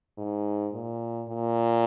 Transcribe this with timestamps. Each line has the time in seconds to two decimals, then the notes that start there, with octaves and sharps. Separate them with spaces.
0.18 G#2
0.73 A#2
1.28 A#2